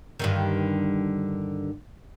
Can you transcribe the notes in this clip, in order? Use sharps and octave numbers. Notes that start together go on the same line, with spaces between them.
G2 D3 D#3